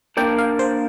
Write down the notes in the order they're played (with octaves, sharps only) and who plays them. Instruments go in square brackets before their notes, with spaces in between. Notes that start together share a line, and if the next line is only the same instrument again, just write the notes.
[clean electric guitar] A#3 D4 A#4 D5 [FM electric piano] G5
[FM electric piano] F5
C5